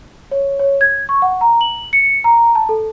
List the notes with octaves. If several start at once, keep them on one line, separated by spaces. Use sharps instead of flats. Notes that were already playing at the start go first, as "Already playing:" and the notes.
C#5
C#5
G#6
C#6
F#5
A#5
F#7
C#7
A#5
A5
A4